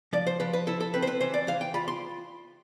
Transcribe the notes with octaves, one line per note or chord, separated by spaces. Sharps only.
F3 D5
C5
F3 B4
B4
E4 A4
A4
C4 B4
C5
B4
E3 C5
D5
E3 F5
G5
F4 B5
C6